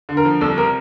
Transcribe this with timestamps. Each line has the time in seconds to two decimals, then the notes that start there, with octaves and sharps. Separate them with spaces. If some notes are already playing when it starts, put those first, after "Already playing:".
0.09 D3
0.17 A#4
0.25 F3
0.41 C2 A4
0.57 C3 A#4